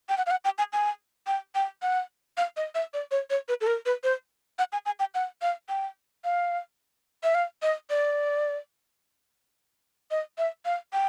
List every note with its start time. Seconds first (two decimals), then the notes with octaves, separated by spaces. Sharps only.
0.09 G5
0.17 F#5
0.26 F5
0.31 F#5
0.45 G5
0.58 G#5
0.73 G#5
1.27 G5
1.55 G5
1.82 F#5
2.37 F5
2.57 D#5
2.75 E5
2.94 D5
3.11 C#5
3.30 C#5
3.48 B4
3.61 A4
3.67 A#4
3.86 B4
4.03 C5
4.59 F#5
4.73 G#5
4.86 G#5
5.00 G5
5.14 F#5
5.42 F5
5.69 G5
6.24 F5
7.23 E5
7.35 F5
7.62 D#5
7.90 D5
10.11 D#5
10.38 E5
10.65 F5
10.93 G5